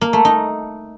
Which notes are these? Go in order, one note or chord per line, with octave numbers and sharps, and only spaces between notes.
A#3
A3
D#4